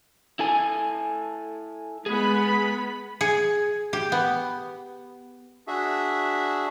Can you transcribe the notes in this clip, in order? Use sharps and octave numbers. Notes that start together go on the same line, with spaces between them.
E4 A4 G#5
G#3 B3 G#4 B5
G#4
G4
B3
D4 F#4 G#4 E5